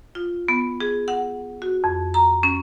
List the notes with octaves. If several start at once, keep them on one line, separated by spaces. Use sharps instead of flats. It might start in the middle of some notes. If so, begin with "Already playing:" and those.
F4
B3
G#4
F#5
F#4
F2
A#5
C#4